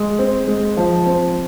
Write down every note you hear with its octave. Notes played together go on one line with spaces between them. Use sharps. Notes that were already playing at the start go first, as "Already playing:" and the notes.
Already playing: G#3
C4
G#3
F3
C4